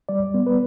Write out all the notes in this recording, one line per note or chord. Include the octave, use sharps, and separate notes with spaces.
G3 D5
B3
B4